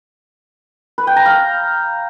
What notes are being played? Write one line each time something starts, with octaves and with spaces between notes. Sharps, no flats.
B4
G5
A#5
F5